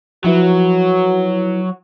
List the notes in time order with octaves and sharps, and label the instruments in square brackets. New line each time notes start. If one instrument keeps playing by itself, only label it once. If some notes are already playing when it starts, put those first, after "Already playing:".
[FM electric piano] F3 E4 B4 [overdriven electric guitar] F#3 [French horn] F#4